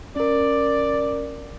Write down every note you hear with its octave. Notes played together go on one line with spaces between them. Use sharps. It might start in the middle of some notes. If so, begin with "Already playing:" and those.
C#4 A#4 D5